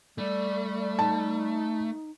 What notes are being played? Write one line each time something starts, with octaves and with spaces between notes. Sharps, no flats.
G3 A3 D5
D#4 A5